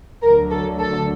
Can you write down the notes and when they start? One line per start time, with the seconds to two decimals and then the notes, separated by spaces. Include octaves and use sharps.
0.22 D2 D3 F#3 A#4
0.51 A4
0.79 A4